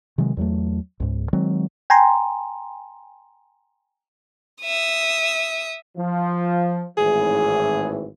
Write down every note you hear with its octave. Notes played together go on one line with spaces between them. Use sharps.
C3 D#3 F#3 G#3
E2 F#3 A3
C#2 G#2
D#3 F#3 G#3 C4
G5 G#5 A#5 C6
E5 D#6
F3
G#1 A2 E3 G#4